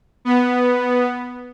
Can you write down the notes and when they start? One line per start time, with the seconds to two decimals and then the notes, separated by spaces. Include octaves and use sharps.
0.25 B3